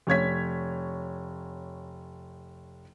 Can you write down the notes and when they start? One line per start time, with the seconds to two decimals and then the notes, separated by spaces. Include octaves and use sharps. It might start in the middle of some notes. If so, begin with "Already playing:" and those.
0.07 F1 C#5 G#6 B6